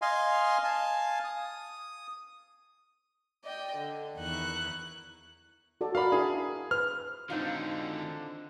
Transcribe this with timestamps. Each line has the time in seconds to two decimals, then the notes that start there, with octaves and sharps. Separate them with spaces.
0.02 D#5 F5 G#5 C6
0.64 F5 G#5 A5
1.24 D#6
3.44 D5 D#5 G5
3.77 D3
4.16 E2 D#3 E4 C#6 F#6
5.81 F#4 A4 D5
5.95 F#4 A#4 D5 F5 B5
6.12 D4 E4 G#4 A#4
6.71 B4 C5 F6
7.30 D3 D#3 C4 D#4 F4 F#4